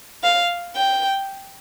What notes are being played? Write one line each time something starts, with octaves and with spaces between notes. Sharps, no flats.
F5
G5